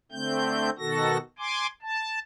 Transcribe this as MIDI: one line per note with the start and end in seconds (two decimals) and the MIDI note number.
0.12 0.70 50
0.12 0.70 57
0.12 0.70 60
0.12 0.70 91
0.79 1.17 47
0.79 1.17 51
0.79 1.17 66
0.79 1.17 69
0.79 1.17 94
1.39 1.67 80
1.39 1.67 84
1.39 1.67 86
1.82 2.19 81